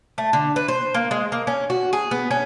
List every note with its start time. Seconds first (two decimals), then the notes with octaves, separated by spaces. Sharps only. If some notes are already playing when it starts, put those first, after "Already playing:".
0.18 A3
0.33 D3
0.56 B4
0.68 C5
0.94 A#3
1.11 G#3
1.32 A#3
1.47 C#4
1.70 F#4
1.93 G#4
2.11 B3
2.31 C#4